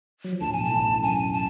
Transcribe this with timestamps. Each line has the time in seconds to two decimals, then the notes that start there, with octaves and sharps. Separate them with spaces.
0.25 F#3
0.33 F3
0.41 D2 D3 A5
0.48 A2
0.53 B1 B2 G#5
0.64 A5
0.71 A1 A2
0.87 F#2
1.02 F#2 G#5
1.33 A5